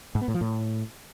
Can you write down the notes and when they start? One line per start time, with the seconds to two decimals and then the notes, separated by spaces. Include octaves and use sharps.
0.15 G#2
0.21 B3
0.28 A2
0.34 F3
0.41 A2